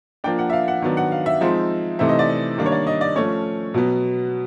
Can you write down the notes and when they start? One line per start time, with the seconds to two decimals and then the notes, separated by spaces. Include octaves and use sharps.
0.24 F3 A#3 D4 G5
0.39 F#5
0.50 E5
0.53 F5
0.68 F#5
0.82 D#3 F#3 B3 D4
0.97 F#5
1.12 F5
1.26 E5
1.41 F3 G#3 C4 D#4
1.99 C3 E3 A3 C4 D#4 E5
2.09 D#5
2.19 D5
2.29 D#5
2.58 D#3 G3 A#3 D4
2.66 C#5
2.72 D5
2.87 D#5
3.01 D5
3.16 F3 A3 C#4 C#5
3.74 B2 F#3 B3